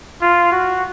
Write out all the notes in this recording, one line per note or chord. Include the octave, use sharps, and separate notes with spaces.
F4
F#4